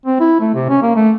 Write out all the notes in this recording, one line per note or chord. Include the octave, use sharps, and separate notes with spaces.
C4
E4
A3
C3
C#4
A#3
A3